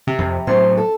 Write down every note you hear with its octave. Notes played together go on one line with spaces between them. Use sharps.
C3
F2
A2 F#3 C4
A4